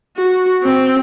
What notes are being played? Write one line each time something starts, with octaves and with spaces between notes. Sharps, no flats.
F#4
C4